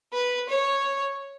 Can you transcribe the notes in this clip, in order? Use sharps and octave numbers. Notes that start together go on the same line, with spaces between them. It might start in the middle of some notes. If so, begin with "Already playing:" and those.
B4
C#5